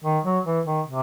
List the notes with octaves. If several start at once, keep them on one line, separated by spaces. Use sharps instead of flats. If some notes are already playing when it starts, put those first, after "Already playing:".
D#3
F#3
E3
D#3
C3